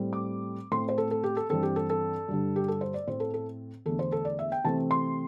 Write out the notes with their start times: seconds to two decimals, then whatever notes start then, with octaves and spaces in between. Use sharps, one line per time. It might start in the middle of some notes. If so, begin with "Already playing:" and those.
Already playing: A2 G3 C4
0.13 D6
0.71 A2 A3 C4 C6
0.89 C5
0.98 A4
1.11 A4
1.24 G4
1.37 A4
1.50 G2 E3 C4 A4
1.63 G4
1.76 A4
1.90 A4
2.28 G2 D3 G3
2.56 G4
2.68 A4
2.81 C5
2.94 D5
3.07 A2 A3 C4 C5
3.20 A4
3.34 A4
3.86 E2 D3 A3 A4
3.99 C5
4.12 A4
4.25 D5
4.39 E5
4.52 G5
4.64 C3 E3 A3 C4 A5
4.91 C6